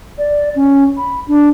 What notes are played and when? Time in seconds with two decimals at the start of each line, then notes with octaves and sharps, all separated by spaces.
0.18 D5
0.56 C#4
0.97 B5
1.28 D4